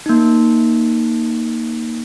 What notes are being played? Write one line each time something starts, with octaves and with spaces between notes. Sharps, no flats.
A#3 D#4